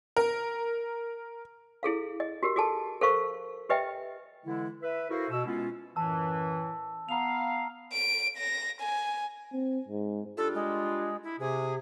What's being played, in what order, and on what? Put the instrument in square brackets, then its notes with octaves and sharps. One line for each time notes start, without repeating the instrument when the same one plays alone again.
[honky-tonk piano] A#4
[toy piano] E4 G#4 A4 F5
D#5
F#4 G4 A#4
F#4 G#4 A4 A5
A4 A#4 C5 F5 C#6
G4 B4 D#5 E5 G5
[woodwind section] D3 E3 G#3 E4
B4 E5
E4 F#4 A4 A#4 C5 F5
B2 E6
G#3 B3 C#4 E4 F4
[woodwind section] F#2 A2 E3 [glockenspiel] A5 E6
[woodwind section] B3 F5 [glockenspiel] A#5 F7
[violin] D7
A#6
G#5
[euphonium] C4
G#2
[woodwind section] G3 D4 F4 [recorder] A4
[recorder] G#3
E4
[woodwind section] C3 [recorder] G#4